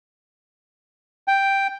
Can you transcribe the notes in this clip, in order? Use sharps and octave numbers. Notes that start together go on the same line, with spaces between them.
G5